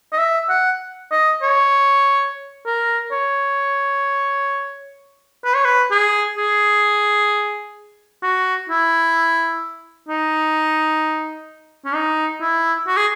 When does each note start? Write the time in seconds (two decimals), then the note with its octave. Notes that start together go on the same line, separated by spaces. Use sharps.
0.13 D#5
0.18 E5
0.49 F#5
1.11 D#5
1.42 C#5
2.66 A#4
3.12 C#5
5.45 B4
5.54 C#5
5.65 B4
5.91 G#4
6.37 G#4
8.23 F#4
8.69 E4
10.09 D#4
11.85 C#4
11.94 D#4
12.41 E4
12.87 F#4
12.97 G#4